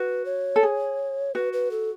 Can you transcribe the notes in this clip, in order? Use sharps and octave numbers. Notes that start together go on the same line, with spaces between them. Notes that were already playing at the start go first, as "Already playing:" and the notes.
Already playing: F#4 B4
C#5
A4
G#4
F#4 B4
B4
A4